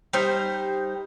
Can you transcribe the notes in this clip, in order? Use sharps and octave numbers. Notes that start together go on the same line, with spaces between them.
G3 D#4 C5